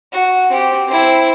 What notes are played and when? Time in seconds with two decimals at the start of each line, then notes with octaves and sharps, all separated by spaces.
0.12 F#4
0.50 C4 G4
0.87 C4 E4